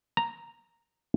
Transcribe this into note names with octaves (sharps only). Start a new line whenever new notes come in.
A#5